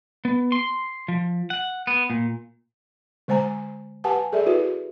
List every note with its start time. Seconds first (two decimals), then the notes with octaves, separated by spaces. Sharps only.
0.25 B3
0.52 C6
1.08 F3
1.50 F#5
1.87 B3
2.10 A#2
3.28 D3 G#3 C5 G#5 A#5
4.04 G4 B4 F#5 G#5 A5
4.32 G#4 A4 D5 E5
4.46 E4 F#4 B4